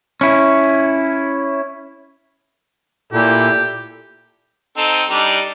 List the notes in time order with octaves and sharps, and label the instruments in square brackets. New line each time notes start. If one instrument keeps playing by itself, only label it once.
[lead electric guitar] C#4 E4
[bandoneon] A#2 [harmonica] E4 A4 [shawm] G4
[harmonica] C4 D#4 A4
G3 D4 D#4